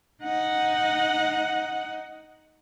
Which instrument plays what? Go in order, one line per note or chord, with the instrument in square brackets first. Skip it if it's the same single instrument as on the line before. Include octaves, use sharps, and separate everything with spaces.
[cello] D#4 F#5